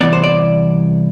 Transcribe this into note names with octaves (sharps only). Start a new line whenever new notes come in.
C2 C3 E3 B3 D5
C5
D5